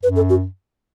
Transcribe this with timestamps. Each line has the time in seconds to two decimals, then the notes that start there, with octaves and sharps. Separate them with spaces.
0.03 F#2 B4
0.16 A4
0.30 F#4